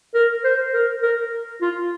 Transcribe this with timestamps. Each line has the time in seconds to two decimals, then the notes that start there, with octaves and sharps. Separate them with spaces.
0.14 A#4
0.44 C5
0.73 A#4
1.02 A#4
1.61 F4